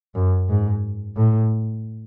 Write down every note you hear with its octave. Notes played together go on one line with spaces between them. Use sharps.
F#2
G#2
A2